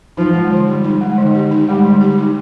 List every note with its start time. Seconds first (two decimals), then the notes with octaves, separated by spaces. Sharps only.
0.17 F3 D#4
0.34 G#3
0.51 D3
0.67 G3 G4
0.84 D#4
1.01 G#3
1.18 D3 D#3
1.35 G4
1.51 D#4
1.68 G3 G#3
1.85 D3
2.01 G4
2.18 D#4